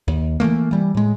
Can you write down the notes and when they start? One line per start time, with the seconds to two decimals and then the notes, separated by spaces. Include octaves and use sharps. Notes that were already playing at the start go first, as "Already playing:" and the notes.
0.08 D#2
0.40 E3 F#3 A3 A#3
0.71 E3 G3
0.95 A2 G#3